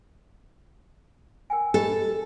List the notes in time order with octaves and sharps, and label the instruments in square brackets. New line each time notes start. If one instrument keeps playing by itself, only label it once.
[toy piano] A#4 G5 G#5
[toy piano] G4 D#5 B5 [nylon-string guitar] A4